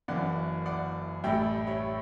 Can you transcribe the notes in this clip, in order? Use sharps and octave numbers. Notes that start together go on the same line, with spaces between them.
F#1 F#2 E3 D5 F#5
D5 F#5
A1 A2 G3 E5 G5
C#5 E5